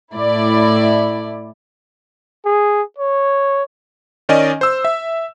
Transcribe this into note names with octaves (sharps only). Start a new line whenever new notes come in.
A2 E4 D5
G#4
C#5
D#3 C#4 D5 D#5 G#5
C5 E6
E5